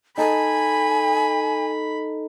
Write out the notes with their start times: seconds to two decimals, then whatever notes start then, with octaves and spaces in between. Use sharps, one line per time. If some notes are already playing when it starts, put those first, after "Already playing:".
0.18 D#4 A4 G#5 B5